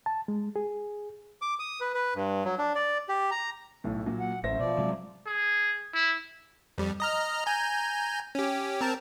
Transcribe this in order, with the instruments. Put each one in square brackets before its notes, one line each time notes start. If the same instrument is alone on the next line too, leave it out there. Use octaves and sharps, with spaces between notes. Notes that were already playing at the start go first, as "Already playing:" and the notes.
[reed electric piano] A5
G#3
G#4
[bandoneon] D6
D#6
B4
B4
G2
F#3
D4
D5
G4
A#5
[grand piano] B1 A2
A#2 F#3
[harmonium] F#5
[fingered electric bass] A1 [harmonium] F#2 [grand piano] C5 E5 A#6
[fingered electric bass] B2 [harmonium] F3 D5
[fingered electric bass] C3 F#3 G#3
[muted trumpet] G#4
E4
[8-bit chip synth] F2 G3
D#5 A#5 F6
G#5 A#5 G6
C#4 G4
C4 A#4 A5